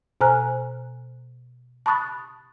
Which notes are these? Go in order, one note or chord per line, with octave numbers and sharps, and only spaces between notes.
B2 C5 G#5 A#5 F6 F#6
A5 B5 C#6 D#6 F#6 A6